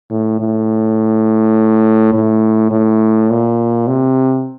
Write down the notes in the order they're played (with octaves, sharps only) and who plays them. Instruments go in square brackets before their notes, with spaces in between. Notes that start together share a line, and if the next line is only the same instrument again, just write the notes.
[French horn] A2
A2
A2
A2
A#2
C3